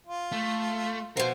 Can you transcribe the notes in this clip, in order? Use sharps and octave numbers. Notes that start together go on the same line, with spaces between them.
F4
A3
B2 F3 A#4 C5